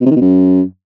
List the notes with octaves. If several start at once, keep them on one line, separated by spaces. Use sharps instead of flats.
B2
C3
D#3
B2
F#2